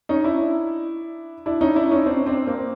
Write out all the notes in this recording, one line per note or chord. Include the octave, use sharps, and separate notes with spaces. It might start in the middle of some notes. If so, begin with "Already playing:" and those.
C#4 D#4
D4 E4
D4 E4
C#4 D#4
D4 E4
C#4 D#4
C4 D4
C4 D4
A#3 C4